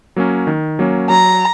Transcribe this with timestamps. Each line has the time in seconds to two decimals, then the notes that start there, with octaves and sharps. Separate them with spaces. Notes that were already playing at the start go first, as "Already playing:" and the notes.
0.16 F#3 A#3 C#4
0.47 D#3
0.79 F#3 A#3 C#4
1.10 F#3 A#5